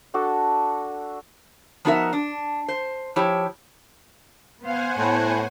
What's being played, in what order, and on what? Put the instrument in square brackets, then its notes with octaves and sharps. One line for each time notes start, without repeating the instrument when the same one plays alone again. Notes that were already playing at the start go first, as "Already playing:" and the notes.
[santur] D4 F#4 A4 D5
[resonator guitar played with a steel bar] F3 B3 D#4 F#4 A#4 E5
D4
C5
F3 E4 G4 C#5
[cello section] B3 F5 [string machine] C5 F#5 G#5
[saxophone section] A2 [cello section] B3 C#5